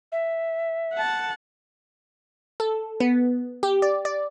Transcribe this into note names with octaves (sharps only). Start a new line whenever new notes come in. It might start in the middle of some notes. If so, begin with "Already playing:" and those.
E5
F#5 A5
A4
B3
G4
D5
D5